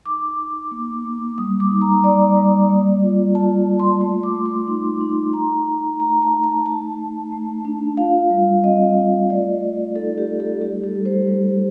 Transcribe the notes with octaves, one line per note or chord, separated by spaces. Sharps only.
D#4 D6
D#4
A#3
A#3
G3 D#6
D6
D#4
A#5
G3 D5
G3
A#3
F4
F4 A5
F4
C6
A3 C6
D6
A3
C6
D#4
D#4
D#4 A#5
D#4
A3 A#5
A5
D#4
A5
A3 A5
A3
A3
D4
F4 F5
G3
C4 D#5
F4
A3 D5
A3
D#4 A4
G4
A3
A4
G3 G4
A4
G3
C5
G3